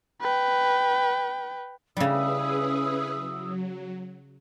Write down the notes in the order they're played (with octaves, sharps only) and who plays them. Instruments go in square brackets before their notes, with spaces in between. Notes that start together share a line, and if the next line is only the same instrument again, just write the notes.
[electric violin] B4 G5
[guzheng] C#3 G3 [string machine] C#4 G#4 B4 [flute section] E4 D#6 E6
[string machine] F#3